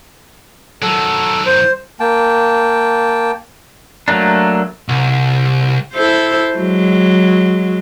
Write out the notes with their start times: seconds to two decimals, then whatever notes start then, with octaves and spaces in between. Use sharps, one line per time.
0.82 D#3 F#3 A4
1.46 C5
2.00 A#3 G5 A5
4.08 F#3 A3 A#3 D4
4.89 C2
5.93 E4 A4 C5
6.56 F#3 G#3